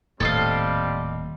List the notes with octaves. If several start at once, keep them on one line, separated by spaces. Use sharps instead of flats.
D#1 A2 G3 C4 A4 D#5 F5